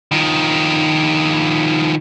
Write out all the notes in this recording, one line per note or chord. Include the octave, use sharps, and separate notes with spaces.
D#3 F3